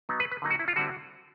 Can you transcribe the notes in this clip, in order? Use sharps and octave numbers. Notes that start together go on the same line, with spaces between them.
F#3 B3 D#4
B4
B4
D3 F#3 A#3 D#4
F#4
E4
F4
D3 G3 C4 E4 F#4